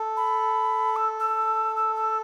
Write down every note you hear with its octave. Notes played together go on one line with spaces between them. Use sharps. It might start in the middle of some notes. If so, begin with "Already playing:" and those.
Already playing: A4
B5
E6
E6
E6
E6